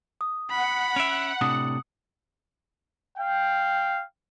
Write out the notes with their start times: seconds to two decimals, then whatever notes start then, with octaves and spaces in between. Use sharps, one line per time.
0.21 D#6
0.51 F#5 B5
0.96 C#4 E5 D7 F7
1.41 A2 C3 D4 D#6
3.18 F5 G5